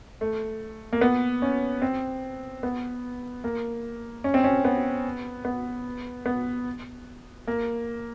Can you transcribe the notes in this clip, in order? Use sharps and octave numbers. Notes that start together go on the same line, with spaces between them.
A3
A#3
B3
C#4
C4
B3
A#3
C#4
C4
C#4
B3
B3
B3
A#3